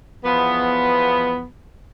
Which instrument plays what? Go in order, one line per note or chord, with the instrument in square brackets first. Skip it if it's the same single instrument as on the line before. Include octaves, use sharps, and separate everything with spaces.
[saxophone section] E2 F3 B3